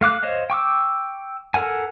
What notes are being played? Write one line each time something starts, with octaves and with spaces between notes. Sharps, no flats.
A3 F5 D6 F#6
C5 C#5 D#5 F5
G5 C#6 D6 E6
A4 A#4 F#5 G#5